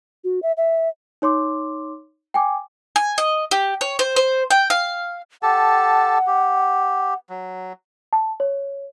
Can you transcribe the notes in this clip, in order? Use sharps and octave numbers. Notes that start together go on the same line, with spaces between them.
F#4
E5
E5
D#4 C#5 C6 D6
G5 G#5 D6
G#5
D#5
G4
C#5
C5
C5
G5
F5
G4 A4 F#5 A5
G4
F#3
A5
C#5